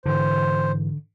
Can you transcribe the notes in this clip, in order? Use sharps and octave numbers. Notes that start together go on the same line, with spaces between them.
G#2 D3 E3 C5